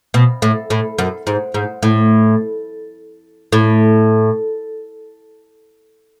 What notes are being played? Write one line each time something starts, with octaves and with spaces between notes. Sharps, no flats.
B2
A2
A2
F#2
G#2
G#2
A2
A2